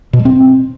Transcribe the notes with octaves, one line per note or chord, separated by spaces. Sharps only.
B2
G3
C4